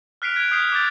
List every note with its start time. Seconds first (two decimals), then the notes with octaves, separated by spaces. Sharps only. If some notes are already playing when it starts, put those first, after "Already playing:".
0.22 F6 F#6 B6 C7 D7 F7
0.35 F#6 G#6 F7
0.52 D#6 G6 C7
0.72 D6 F6 G6 A6 D7